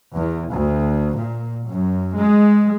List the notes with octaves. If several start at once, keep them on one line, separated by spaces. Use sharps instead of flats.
E2
D2
A#2
F#2
G#3